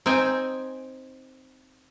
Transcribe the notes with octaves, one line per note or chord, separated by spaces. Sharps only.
C4 D#4 G5 G#5